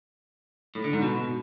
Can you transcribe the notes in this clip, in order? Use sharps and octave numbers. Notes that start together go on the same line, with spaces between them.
A2
D3
G#2
B2